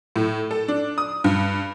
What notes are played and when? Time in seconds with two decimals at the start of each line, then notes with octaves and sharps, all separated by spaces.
0.16 A2
0.51 A4
0.68 D4
0.98 D#6
1.24 G2